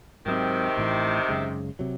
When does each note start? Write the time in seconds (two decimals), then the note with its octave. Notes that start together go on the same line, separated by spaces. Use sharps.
0.26 G#2 C3 D#3 F#3 C4
0.77 A1 A2 E3
1.28 F#2 C#3 G#3
1.79 C3 F#3